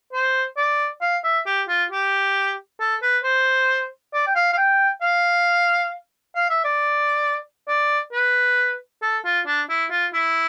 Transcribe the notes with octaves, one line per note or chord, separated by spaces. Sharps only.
C5
D5
F5
E5
G4
F4
G4
A4
B4
C5
D5
G5
F5
F5
G5
F5
F5
E5
D5
D5
B4
A4
F4
D4
E4
F4
E4